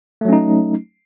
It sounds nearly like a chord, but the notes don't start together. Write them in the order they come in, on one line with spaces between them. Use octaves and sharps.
A3 F#3 C#4 D#4